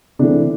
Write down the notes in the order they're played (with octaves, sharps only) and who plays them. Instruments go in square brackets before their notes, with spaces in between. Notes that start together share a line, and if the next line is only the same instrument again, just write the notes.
[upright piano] C3 E3 A3 D4